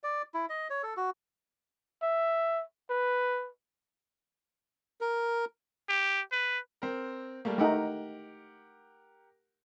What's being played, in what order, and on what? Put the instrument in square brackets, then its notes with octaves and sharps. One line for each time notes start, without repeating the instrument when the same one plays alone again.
[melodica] D5
E4
D#5
C#5
A4
F#4
[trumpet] E5
B4
[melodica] A#4
[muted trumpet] G4
B4
[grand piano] C4 A#4
G3 A3 A#3
[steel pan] A3 D#4 [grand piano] G4 A#4 F#5